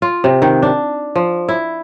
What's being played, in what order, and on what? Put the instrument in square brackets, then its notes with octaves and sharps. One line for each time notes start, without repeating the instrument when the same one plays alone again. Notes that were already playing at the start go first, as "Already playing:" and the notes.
[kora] F4
C3
D#3
D4
F3
E4